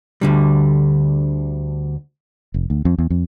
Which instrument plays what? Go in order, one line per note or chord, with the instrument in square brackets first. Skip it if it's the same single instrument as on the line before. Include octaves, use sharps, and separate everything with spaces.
[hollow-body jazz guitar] D2 D3 G3
[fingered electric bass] F1
D2
F2
E2
F2